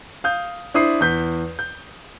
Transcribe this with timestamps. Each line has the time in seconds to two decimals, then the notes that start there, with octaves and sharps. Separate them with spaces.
0.24 F5 D#6 G6
0.74 D4 E4 C5 D#6 C7
1.00 E2 G6 B6
1.59 G6